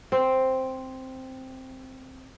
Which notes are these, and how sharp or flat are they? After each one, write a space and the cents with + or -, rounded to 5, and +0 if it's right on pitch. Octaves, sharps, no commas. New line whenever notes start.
C4 +0